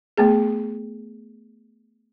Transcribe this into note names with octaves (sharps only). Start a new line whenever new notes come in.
A3 B3 G#4